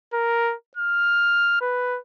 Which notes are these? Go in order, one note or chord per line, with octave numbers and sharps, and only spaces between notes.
A#4
F6
B4